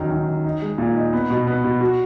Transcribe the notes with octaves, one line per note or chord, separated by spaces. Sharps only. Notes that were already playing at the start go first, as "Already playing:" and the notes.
Already playing: F#2 D#3
D#3
D#3
D#4
G#3
A#2
D#4
B3
B2
B3
B2
F#4